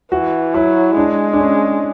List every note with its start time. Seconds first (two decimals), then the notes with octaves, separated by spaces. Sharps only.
0.12 E3 F#4
0.54 F#3 E4
0.97 G#3 D4
1.33 D4
1.40 C#4